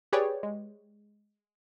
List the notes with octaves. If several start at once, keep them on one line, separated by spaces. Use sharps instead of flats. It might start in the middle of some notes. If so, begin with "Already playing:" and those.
G4 G#4 B4 C#5 D5 G5
G#3